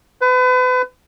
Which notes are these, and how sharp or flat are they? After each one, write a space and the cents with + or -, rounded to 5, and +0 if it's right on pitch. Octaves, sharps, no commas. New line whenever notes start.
B4 +35